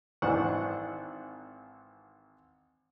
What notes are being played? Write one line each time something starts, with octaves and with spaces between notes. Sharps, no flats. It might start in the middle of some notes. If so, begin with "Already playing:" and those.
G#1 E3 D4 C5 F#5 C#6